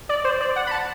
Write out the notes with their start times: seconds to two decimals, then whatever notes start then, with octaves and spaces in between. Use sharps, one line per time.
0.09 D5
0.24 C5
0.40 D5
0.56 F#5
0.67 B5
0.71 A5